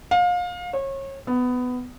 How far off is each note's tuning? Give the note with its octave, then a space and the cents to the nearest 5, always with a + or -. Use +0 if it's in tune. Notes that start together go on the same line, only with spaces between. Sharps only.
F5 +30
C#5 -30
B3 +15